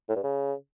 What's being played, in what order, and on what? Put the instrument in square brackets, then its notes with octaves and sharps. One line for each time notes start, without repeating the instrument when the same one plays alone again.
[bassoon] A2
G2
C#3